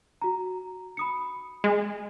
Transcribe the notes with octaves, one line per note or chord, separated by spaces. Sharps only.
F#4 A#5
B5 D#6 C#7
G#3